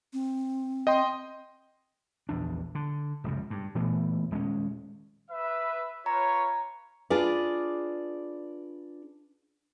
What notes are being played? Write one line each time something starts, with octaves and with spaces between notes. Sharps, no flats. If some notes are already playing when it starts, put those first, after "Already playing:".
C4
D#5 G5 C6
A#1 E2 D4
D3
F1 C#2 F#2
G2
A#2 E3 A3 B3
D#1 G#3 C4 C#4
B4 E5
F4 B4 C#5 A#5
D4 F4 G#4 B4 D5